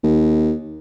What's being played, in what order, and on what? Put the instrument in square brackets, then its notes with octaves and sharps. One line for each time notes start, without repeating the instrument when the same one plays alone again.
[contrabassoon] D#2